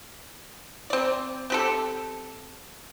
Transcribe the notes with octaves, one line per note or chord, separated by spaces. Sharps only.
C4 D5
C4 G4 A4